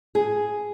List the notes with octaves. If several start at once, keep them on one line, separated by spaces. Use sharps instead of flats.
G#4